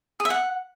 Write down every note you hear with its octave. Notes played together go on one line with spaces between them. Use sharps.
G#4
E5
F#5